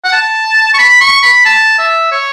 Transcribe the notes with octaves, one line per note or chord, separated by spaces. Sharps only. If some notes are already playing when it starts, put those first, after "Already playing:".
F#5
A5
C#6
B5
C#6
B5
A5
E5
C#5